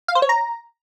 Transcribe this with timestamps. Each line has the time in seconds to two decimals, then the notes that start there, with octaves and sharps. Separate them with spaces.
0.08 F5
0.15 C5
0.22 C#5
0.29 A#5